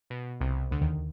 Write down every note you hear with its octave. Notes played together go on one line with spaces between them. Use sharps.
B2
C2 C3
D2 D3
D#2 D#3